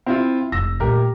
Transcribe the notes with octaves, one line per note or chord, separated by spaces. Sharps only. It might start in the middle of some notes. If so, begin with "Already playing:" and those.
C4 E4 F4
F1 E6 A#6
A#2 A3 G4 A#4